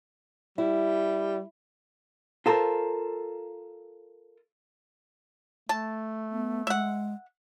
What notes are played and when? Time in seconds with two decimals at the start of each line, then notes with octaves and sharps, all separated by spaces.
0.58 G3 E4
2.46 F4 A4 A#4 C5
5.69 A3 A5
6.31 B3
6.67 G#3 E5 F#5